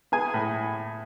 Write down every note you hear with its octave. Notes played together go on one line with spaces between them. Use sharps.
B3 G#4 G#5
A2